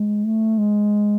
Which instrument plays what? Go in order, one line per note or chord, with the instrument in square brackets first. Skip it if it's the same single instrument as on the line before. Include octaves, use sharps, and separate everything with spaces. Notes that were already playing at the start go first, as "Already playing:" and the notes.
Already playing: [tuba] G#3
A3
G#3